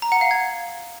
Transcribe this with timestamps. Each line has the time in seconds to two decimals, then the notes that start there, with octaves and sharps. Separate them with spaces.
0.02 A#5
0.12 F#5
0.21 F5
0.31 G#6